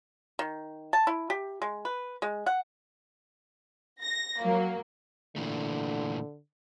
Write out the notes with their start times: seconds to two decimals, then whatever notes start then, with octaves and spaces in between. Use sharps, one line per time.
0.39 D#3
0.93 A5
1.07 E4
1.30 G4
1.62 G#3
1.85 B4
2.22 G#3
2.46 F#5
4.01 A#6
4.41 F#3 A#3
5.36 A#2 D3 E3 A3